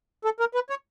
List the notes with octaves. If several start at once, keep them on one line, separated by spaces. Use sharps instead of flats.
A4
A#4
B4
C#5